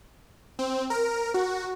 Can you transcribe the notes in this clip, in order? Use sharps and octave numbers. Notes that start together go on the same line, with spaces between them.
C4
A#4
F#4